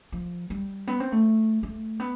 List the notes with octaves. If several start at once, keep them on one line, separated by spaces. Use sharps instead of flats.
F3
G3
B3
C4
A3
A3
B3